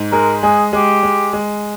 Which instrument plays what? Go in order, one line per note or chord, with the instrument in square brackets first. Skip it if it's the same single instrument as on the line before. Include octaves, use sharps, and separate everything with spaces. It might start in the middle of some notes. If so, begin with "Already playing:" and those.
Already playing: [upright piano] G#2
[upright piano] G#3 [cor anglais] A#4
[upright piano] G#3 [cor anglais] G#4
[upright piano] G#3 [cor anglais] G4
[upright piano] G#3
G#3